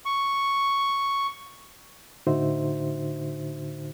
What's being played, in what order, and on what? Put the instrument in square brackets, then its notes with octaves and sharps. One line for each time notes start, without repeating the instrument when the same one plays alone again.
[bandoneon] C#6
[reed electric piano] A2 D3 D#4 F#4 C5 E5